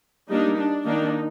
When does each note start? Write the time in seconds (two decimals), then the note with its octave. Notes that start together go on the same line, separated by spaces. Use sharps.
0.29 G3 A#3 D4 D#4
0.57 D4
0.86 D#3 A#3 D4 D#4